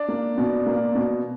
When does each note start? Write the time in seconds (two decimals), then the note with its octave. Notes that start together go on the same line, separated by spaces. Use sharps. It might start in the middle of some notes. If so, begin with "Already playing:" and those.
Already playing: D4 D5
0.09 A#3
0.38 B2
0.67 A#3
0.95 B2